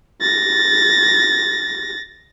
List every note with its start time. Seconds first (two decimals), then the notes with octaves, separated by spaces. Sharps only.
0.21 A6 A#6